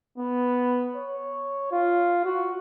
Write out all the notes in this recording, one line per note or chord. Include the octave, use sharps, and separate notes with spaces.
B3
C#5
F4
F#4